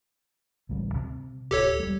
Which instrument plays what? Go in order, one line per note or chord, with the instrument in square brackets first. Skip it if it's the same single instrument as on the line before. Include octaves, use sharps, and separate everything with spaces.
[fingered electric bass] A1 D2 G3
C3
[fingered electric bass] D1 [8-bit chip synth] G4 A4 C#5
[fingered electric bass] G3 G#3